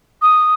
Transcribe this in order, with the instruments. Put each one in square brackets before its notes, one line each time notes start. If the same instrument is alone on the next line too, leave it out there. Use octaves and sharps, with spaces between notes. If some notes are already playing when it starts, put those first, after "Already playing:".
[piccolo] D#6